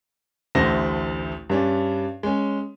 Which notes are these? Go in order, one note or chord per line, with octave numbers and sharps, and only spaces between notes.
A1 D2 D3 A3 C5 A#6
G2 C#4 D4
G#3 C#4